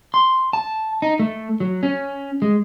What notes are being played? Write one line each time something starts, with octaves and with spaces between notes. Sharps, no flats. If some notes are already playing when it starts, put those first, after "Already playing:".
C6
A5
D#4
A3
F#3
C#4
G#3